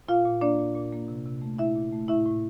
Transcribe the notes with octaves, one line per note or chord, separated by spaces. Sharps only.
A#2 F4 F5
A#2
A#3 D4 D5
A#2
A#2
A#3
C3
C3
A3
A#2 E4 E5
A#2
A3
A2 E4 E5
A2